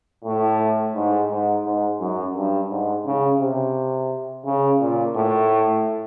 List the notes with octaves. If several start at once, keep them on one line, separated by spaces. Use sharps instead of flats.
A2
G#2
G#2
G#2
F#2
G2
G#2
C#3
C3
C#3
A#2
A2